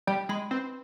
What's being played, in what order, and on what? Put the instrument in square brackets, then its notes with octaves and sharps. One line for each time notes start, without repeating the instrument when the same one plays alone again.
[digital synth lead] G3 [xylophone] G5
[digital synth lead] G#3 [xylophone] B5
[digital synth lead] C4 [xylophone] B4